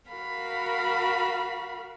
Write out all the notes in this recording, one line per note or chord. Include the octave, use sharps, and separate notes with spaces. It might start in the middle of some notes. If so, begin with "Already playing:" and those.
F#4 A#4 F5 B5